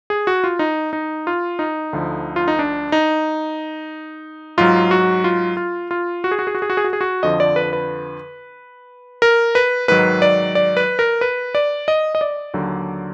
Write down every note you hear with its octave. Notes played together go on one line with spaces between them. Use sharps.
G#4
F#4
F4
D#4
D#4
F4
D#4
D2 D3 F3
F4
D#4
D4
D#4
G#2 F#3 F4
F#4
F4
F4
F4
F#4
G#4
F#4
G#4
F#4
G#4
F#4
G#4
F#4
G#4
F#4
F2 D3 F3 D#5
D5
B4
B4
A#4
B4
G#2 D#3 F#3 B4
D5
D5
B4
A#4
B4
D5
D#5
D#5
D5
D#2 D3 F#3